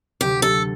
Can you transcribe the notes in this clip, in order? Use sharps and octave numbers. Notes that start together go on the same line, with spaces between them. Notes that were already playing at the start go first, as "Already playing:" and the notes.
D2 C3 F#3 G4
A4